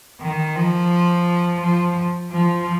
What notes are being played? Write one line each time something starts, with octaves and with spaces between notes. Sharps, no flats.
D#3
F3
F3
F3